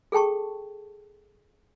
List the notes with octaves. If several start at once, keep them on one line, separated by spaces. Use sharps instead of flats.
G#4 A4 G5 A5 C#6